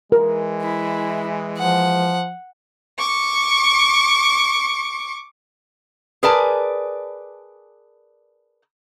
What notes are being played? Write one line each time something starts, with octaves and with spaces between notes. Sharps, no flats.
E3 G#3 A#4
E4
F3 F#5
C#6 D6
G#4 A#4 B4 D5 G#5 A5